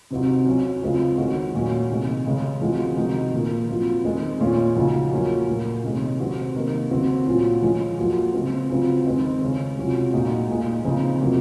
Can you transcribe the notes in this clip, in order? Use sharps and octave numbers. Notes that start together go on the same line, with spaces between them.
C3 F#3 C4 D#4 F#4
F#3 C#4 F#4
C#3 G#3 C4 F4
D#3 G#3 C#4 F#4
A#2 F#3 C#4
C3 D#3 G#3
C#3 G#3 C#4
F3 G#3 C4 F#4
C3 D#3 G#3 D#4 F#4
A#2 F3 A#3
F#3 C4 F4
D#3 G#3 C4
A#2 G#3 C#4 F4
C#3 F3 G#3 D#4 F#4
F#3 A#3 C#4 F4
A#2 F#3 A#3
C3 D#3 G#3 C#4
C3 F#3 C4 F#4
C3 D#3 A#3
C#3 F#3 C4 F#4
A#2 F#3 C#4 F4
F3 G#3 C#4
F#3 A#3 F4
C#3 G#3 C4
C#3 F#3 C4 F4
D#3 G#3 C4
C#3 G#3 C#4
C3 F#3 C#4 F4
A#2 G#3 D#4 F#4
A#2 G#3 D#4
C#3 F3 C4 D#4
C3 F#3 A#3 F4